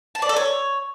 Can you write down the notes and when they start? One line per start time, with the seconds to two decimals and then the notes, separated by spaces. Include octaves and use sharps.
0.15 A5
0.22 D5
0.29 A4
0.36 C#5